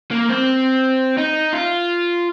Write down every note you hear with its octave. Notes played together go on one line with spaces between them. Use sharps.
A#3
C4
D#4
F4